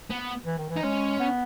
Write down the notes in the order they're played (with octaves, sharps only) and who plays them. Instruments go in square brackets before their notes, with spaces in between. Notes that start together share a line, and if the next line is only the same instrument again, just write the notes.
[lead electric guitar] B3
[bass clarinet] E3
D#3
E3
[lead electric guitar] D#4
[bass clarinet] G#3 [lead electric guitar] C#4
[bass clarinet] B3